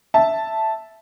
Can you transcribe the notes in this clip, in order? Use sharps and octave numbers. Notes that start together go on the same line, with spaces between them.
E5 A5